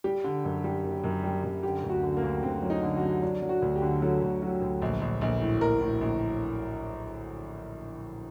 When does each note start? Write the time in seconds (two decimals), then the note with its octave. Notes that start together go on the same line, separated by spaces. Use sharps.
0.04 G3 G4
0.24 D3
0.44 F#2
0.64 G3
0.84 F#1
1.04 F#2
1.24 G3
1.44 F#2
1.63 D3 G4
1.84 D2
1.89 F#4
2.03 D3
2.17 A#3
2.23 D2
2.43 D2 C4
2.63 F#3
2.70 D#4
2.83 D3
2.96 F#4
3.03 F#3
3.22 F#3 D4
3.42 F#3
3.49 F#4
3.62 D2
3.76 G4
3.82 D3
4.02 F#3 A4
4.22 D2
4.42 F#3
4.62 D2
4.82 A#1
5.01 A#1
5.21 A#1
5.41 A2
5.61 A#1 A#4
5.81 A2
6.01 A#1